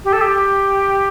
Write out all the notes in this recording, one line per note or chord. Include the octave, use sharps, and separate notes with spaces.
G4
A4
G4